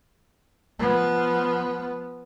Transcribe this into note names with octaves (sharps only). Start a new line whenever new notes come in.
F3 B3